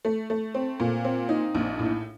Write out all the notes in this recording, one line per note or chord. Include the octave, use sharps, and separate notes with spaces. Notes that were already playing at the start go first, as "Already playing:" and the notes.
A3
A3
C4
A#2
C4
D#4
A#1
A2